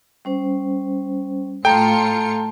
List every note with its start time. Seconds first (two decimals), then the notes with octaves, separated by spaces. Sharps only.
0.25 G3 C#4 C5
1.65 A2 F4 A4 G5 A5 A#5 C#7